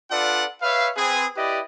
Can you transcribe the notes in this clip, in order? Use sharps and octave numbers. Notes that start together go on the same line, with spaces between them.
D4 F4 A4 B4 D5 F#5
B4 C#5 E5 F5
C4 G#4 B4
E4 G4 B4 D5 D#5